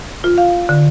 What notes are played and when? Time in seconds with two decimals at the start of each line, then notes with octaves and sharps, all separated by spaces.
0.24 F4
0.38 F5
0.69 D3